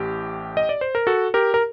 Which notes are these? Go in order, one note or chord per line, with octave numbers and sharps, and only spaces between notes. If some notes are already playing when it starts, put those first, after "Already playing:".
Already playing: A1 A2 G4
D#5
D5
C5
A#4
F#4 A4
G4 A#4
A#4